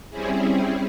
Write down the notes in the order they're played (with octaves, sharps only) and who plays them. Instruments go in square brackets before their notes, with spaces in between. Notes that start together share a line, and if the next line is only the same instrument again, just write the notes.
[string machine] G3 C4 C#4 E4 G#4